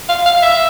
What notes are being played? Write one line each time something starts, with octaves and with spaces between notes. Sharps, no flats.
F5
F5
E5